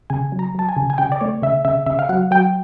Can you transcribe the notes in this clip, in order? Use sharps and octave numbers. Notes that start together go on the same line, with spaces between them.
C#3 G#5
F#3
A#5
F#3 A5
G#5
C#3
G#5
C#3 G5
D5
A3 C#5
C#3 E5
C#3 E5
C#3 E5
F5
F#3 F#5
F#3 G5